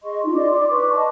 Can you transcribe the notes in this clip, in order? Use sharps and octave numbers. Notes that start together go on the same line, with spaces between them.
G#4 D#5 C6 C#6
D4 D#4 F4
D5 D#5 C6 D6
D5 C6 D6
B4 C#6 D6
D#5 A5 C6